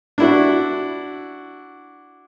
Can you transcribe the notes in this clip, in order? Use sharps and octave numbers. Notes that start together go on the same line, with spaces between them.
D4 E4 F#4